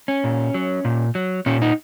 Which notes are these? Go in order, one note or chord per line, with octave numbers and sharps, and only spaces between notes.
C#4
A#2
F#3
A#2
F#3
A#2 C#4
D#4